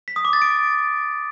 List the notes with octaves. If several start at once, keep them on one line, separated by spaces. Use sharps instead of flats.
B6
D#6
D6
A6
D7